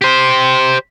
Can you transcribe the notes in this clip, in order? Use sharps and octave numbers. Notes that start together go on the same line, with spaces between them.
G4 C5